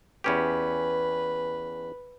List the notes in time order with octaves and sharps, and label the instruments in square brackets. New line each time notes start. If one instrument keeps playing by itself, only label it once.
[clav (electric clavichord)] E2 C#4 G4 [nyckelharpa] B4